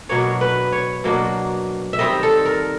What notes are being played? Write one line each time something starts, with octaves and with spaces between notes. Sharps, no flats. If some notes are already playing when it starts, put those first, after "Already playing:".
B2 F#3 A#3 D4 C#5
B4
C#5
B2 F#3 A#3 D4
E5
D#3 G3 C4 D#5
A4
A#4